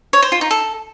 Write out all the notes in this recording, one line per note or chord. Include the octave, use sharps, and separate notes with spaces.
C#5
C5
F4
D#4
A4